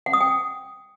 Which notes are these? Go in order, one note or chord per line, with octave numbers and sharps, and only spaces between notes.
F#5
D#6
G5